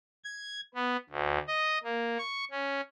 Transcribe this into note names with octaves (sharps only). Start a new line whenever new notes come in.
G#6
B3
D2
D#5
A#3
C#6
C#4